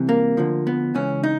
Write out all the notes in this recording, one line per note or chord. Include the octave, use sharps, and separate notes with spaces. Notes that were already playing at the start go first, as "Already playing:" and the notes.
Already playing: C2 C3 E3
A#3
D2 D3 F3
B3
C#2 C#3 E3 C#4
D#4